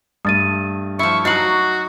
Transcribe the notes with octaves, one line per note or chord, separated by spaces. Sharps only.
G2 A3 D#6 A6 D#7
F3 E4 C#6
F#3 D#4 F#4 C#6 C7 F#7